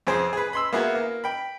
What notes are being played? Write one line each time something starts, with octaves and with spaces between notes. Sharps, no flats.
F2 C4 G#4 C5
G#4 B4
B5 C6 E6
A#3 B3 E4 F#4 G#4
A#3
G5 B5